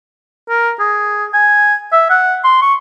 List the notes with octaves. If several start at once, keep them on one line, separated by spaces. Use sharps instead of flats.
A#4
G#4
G#5
E5
F#5
C6
C#6